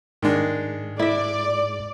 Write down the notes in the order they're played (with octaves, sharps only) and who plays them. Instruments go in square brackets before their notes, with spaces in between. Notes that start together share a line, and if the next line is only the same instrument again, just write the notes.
[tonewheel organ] G#2 [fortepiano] D#3 G#3 D4
[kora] E4 E5 [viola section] D5